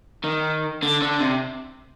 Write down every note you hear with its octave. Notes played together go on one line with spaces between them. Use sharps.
D#3
D3
D3
C3